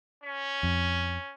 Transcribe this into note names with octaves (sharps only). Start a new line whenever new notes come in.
C#4
F2